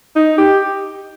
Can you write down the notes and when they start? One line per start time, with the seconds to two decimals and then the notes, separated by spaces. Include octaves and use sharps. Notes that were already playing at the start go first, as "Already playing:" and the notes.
0.16 D#4
0.38 G4